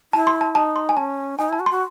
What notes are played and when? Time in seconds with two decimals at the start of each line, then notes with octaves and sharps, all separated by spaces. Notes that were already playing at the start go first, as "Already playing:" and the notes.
0.13 E4 A5
0.27 C6
0.41 A5
0.55 D#4 A5
0.76 C6
0.89 G#5
0.97 C#4 A5
1.38 D#4 G#5
1.49 E4 A5
1.60 F#4
1.66 C6
1.70 F#4